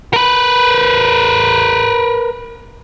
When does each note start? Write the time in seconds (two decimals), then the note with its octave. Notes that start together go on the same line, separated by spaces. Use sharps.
0.13 A#4 B4